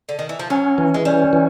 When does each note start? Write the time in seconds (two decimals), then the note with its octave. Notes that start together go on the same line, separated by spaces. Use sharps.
0.09 D3
0.19 D#3
0.29 E3
0.39 F3
0.50 F#3 C#4
0.78 E3
0.94 G#3
1.05 G3 C#4
1.33 E3